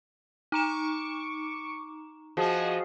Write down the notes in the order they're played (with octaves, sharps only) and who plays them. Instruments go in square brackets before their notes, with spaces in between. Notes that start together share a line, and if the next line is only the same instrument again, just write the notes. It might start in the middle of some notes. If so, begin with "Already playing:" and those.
[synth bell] D#4 A#5 E7 [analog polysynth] C#6 D6
[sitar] F3 [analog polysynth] F#4 G#4 D#5